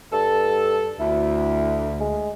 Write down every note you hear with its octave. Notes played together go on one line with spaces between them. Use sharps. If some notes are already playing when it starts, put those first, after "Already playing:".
G2 A4
D2 E4
G#3